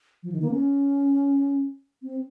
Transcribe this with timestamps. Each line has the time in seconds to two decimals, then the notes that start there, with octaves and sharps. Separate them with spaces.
0.23 F3
0.32 D#3
0.42 A#3
0.51 C#4
2.02 C4